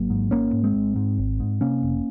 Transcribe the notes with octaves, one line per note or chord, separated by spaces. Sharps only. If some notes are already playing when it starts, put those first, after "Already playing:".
Already playing: G#1 F#3 A#3
G#2
G#1 A#3 C#4
G#2
G#3 C4
G#1
G#2
G#1
G#2
C3 A#3 C#4
F1